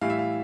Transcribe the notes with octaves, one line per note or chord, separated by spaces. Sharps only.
A2 E3 G3 F5
E5
F5